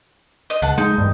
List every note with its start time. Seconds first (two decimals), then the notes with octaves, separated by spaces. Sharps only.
0.50 D#5
0.62 C#2 F#5 A5
0.78 G#3 D#4
0.98 E1 G2